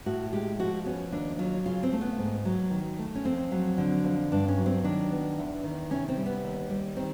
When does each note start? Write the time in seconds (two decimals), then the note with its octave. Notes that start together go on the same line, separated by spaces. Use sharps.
0.06 A2 F#4
0.33 G#3 G4
0.59 F3 F#4
0.85 B3 C#4
1.12 D#2 D4
1.39 F#3 F4
1.66 C#3 F4
1.83 C4
1.92 A3
2.01 B3
2.18 G#2
2.45 F#3
2.71 D#3
2.99 A3
3.15 C#4
3.25 F2 C4
3.52 F#3
3.78 D3
4.04 F2
4.32 G2 D4
4.48 C#4
4.57 F#3
4.66 C4
4.84 D#3 D4
5.11 B3
5.38 E2
5.64 D#3
5.90 C3 C#4
6.08 C4
6.17 G3
6.26 B3
6.44 D#2
6.70 G3
6.96 D#3 C4